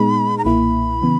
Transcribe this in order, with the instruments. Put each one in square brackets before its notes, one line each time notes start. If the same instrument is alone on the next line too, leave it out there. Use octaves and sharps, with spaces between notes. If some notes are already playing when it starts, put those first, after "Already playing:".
Already playing: [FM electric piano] A#2 G#3 B3 D#4 G#4 [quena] B5
[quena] A#5
[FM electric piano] B1 A#2 A#3 E4 [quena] B5
[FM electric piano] C#3 E3 B3